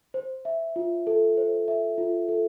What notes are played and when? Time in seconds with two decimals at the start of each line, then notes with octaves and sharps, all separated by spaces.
0.14 C5
0.45 E5
0.76 F4
1.07 A4
1.37 C5
1.68 E5
1.98 F4
2.29 A4